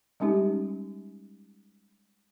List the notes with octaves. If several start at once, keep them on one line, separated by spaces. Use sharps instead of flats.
G3 G#3 C#4 D#4 G4